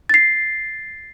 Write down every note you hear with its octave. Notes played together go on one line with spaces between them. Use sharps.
A6 C7